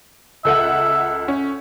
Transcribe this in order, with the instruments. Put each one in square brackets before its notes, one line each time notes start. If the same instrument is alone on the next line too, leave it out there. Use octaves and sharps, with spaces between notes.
[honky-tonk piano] C#2 A4 F#5 [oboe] E5
[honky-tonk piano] C#4